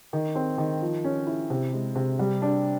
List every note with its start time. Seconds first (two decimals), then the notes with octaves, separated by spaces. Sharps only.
0.13 D#3
0.35 C4
0.58 D#3
0.82 F3
1.04 C#4
1.27 E4
1.50 C3
1.73 G#3
1.95 C3
2.19 G3
2.42 D4